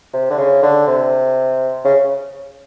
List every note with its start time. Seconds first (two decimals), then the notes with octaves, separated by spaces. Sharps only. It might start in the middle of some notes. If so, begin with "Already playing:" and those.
0.13 C3
0.30 D3
0.38 C#3
0.63 D3
0.87 C3
1.84 C#3